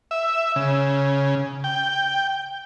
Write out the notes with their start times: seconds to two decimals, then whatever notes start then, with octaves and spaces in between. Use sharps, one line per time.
0.11 E5
0.56 C#3
1.64 G5